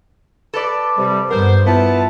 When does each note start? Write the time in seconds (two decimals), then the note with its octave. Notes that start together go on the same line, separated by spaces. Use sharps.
0.54 A4 B4 D5
0.98 C3 G3
1.30 G2 B3 A#4 C5
1.66 B3 E4 F4 A5